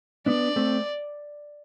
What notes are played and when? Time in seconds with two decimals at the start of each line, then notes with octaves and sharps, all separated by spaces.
0.26 B3 D4 D5
0.56 A3 C4